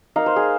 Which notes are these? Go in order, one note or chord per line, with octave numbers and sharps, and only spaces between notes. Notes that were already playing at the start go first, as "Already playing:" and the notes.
A#3 D#4 F5
C5
G#4